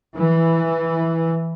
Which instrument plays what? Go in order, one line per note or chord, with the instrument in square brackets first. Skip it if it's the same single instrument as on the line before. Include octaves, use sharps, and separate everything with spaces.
[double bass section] E3